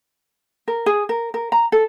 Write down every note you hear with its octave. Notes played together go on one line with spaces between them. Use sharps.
A#4
G#4
A#4
A#4
A#5
A4